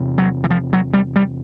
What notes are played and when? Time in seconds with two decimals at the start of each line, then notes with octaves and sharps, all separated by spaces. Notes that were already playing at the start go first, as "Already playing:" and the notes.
Already playing: E2 C3
0.18 F#3
0.44 E3
0.50 F3
0.73 F#3
0.94 G3
1.16 G3